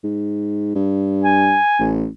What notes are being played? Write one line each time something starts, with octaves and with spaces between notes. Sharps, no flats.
G#2
G2
G#5
A1